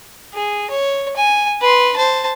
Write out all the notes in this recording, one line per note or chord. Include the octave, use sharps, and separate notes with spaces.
G#4
C#5
G#5
B4 C6
C5 A5